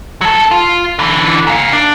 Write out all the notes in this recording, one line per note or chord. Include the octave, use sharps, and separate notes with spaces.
F#3 A4
F4
D3 E3
G#2 F5
D4